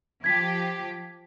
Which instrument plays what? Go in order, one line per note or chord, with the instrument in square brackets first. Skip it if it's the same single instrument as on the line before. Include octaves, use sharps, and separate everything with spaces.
[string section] F3 G4 [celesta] G#6 B6